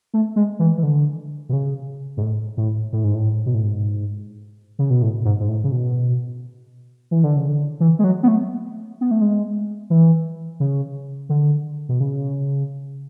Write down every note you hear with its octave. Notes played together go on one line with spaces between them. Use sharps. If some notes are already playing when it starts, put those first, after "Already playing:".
A3
G#3
E3
E3
D3
B2
C#3
G#2
A2
A2
A2
G#2
A2
B2
A2
G#2
C#3
B2
A2
G#2
G#2
A2
C#3
B2
E3
D3
C#3
D3
E3
G#3
F#3
B3
A3
B3
A3
G#3
E3
C#3
D3
B2
C#3